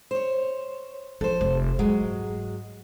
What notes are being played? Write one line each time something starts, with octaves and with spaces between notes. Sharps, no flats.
C5 C#5
F3 A4 C5
F1
G#2 F#3 G#3